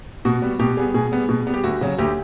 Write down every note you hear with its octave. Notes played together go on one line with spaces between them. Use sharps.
B2 F#4
G3 B3
B2 G4
G3 B3 G#4
B2 G#4
G3 B3
B2
G3 B3
G4
D2 F#4
C#3 F#3
D2 G4